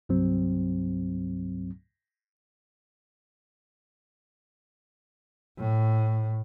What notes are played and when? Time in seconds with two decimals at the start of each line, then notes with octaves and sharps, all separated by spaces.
0.09 C2 G2 F#3 C4
5.59 A2